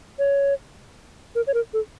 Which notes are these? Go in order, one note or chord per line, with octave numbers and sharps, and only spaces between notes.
C#5
A#4
C#5
A#4
A4